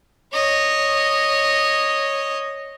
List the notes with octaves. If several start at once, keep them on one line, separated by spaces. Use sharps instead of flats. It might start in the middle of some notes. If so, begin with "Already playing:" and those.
C#5 D#5